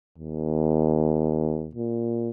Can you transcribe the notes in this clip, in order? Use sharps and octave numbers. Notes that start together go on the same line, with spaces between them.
D#2
A#2